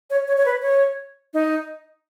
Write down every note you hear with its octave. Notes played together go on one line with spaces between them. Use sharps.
C#5
C#5
C#5
B4
C#5
D#4